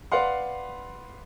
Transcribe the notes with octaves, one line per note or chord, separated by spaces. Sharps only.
B4 D5 F5 F#5 C6